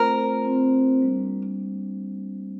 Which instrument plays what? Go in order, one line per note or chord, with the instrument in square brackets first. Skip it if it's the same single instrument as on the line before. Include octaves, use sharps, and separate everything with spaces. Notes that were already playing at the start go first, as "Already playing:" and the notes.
Already playing: [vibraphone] A3 C4 F4 C5 [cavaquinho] A#4
[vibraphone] A3 C4 F4 C5
G3 A#3 D4